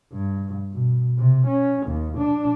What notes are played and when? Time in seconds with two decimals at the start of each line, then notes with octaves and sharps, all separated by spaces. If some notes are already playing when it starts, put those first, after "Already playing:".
0.12 G2
0.71 B2
1.18 C3
1.47 C#4
1.87 D#2
2.18 D4